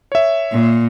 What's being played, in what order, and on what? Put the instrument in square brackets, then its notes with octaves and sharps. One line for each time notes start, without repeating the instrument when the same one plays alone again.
[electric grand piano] C#5 E5
[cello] A#2